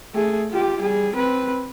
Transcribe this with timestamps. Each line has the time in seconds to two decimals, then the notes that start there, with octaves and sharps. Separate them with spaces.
0.14 A3 G#4
0.50 F4 G4
0.80 G3 G#4
1.14 C4 B4